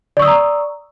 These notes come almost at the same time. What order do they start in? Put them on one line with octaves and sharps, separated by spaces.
D5 C#6 E6 D#6 A#5